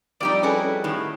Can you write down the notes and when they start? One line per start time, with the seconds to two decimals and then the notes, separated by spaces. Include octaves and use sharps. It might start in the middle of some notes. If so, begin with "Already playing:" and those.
0.21 F2 G3 D#4 D5 G5
0.43 C#4 E4 F#4 G#4 A4 B4
0.84 A2 D#3